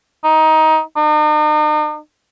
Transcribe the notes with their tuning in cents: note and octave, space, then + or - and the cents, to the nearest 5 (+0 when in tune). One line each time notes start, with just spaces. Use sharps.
D#4 +15
D#4 -45